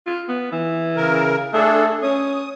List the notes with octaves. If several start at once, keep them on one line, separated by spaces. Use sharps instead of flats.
F4
B3
E3
C#3 A#4
A3 D4 G#4 A4
C#4 D#6